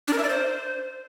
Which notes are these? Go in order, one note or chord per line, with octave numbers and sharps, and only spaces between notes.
D4
A#4
E5
D5
C5